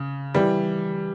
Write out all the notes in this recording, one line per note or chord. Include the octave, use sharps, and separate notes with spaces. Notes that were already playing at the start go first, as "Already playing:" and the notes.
Already playing: C#3
E3 G3